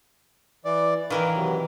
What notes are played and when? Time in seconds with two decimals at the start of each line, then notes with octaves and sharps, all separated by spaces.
0.65 E3 D5
1.10 D#3 E3 A#4 B4 F5
1.35 C3 F#3